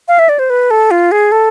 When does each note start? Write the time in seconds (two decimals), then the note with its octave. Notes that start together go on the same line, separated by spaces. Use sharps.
0.08 F5
0.19 E5
0.29 D5
0.39 C5
0.50 B4
0.71 A4
0.91 F4
1.12 G#4
1.32 A4